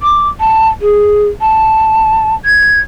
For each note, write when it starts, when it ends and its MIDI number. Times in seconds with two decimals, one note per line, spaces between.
0.03 0.29 86
0.40 0.69 81
0.82 1.28 68
1.41 2.35 81
2.45 2.80 92